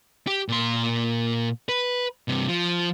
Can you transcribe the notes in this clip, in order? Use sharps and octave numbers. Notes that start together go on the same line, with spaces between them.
G4
A#2 C6
B4
G2 C3
F3